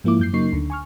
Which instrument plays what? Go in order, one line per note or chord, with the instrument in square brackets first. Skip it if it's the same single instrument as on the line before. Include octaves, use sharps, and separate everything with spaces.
[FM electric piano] G#2 F3 A#3 E4 D6
F#2 G6 C7
C#3 F#3 A#3 D#4 C#6 C7
D2 D3
G#5 C#6 F6